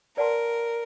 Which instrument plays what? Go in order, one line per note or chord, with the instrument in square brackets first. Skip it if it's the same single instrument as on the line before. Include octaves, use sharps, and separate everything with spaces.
[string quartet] A#4 [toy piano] B4 D5 F#5 A5 C6